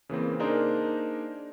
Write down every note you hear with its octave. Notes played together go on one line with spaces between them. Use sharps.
C#3 E3 A#3 C4
A#3 D4 D#4 G#4 A#4 C5